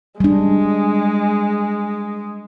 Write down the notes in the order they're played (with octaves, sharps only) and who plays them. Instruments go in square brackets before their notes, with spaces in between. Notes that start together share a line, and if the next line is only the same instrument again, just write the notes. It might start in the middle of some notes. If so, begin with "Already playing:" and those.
[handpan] G3 D4 [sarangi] G#3